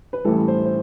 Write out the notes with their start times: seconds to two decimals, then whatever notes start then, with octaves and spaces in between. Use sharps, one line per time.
0.13 B4
0.24 A1 A2 E3 G3 A4
0.48 C5
0.65 C5